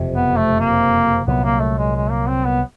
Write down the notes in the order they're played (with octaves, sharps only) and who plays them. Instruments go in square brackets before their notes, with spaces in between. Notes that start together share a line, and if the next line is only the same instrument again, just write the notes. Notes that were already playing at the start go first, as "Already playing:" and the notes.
Already playing: [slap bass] F#1 F2 C3
[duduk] B3
A3
A#3
[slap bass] C2 A#2 F#3 [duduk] B3
[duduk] A#3
A3
G#3
G#3
A#3
C4
B3